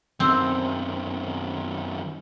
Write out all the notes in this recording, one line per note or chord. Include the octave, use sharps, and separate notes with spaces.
F#2 D#3 C4